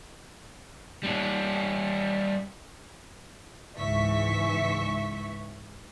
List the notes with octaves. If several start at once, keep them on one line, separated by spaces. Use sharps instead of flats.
G3 C#4
C#2 G#2 E3 E5 C#6 B6